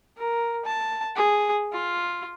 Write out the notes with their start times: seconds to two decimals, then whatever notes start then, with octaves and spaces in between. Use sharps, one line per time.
0.17 A#4
0.65 A5
1.16 G#4
1.72 F4